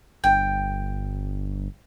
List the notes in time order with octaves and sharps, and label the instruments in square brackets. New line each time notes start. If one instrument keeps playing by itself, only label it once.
[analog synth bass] G1 [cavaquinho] G5